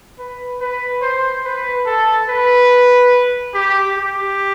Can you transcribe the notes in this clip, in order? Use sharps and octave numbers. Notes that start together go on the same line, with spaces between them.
B4
B4
C5
B4
A4
B4
G4
G4